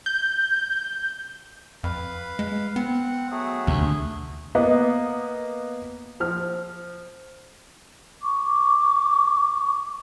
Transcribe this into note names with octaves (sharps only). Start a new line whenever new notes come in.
G6
F2 B4 F5
G#3
B3 C4 F#5
F#3 A3 G#4
D2 C3
A#3 B3 D#5
F3 F6
C#6 D6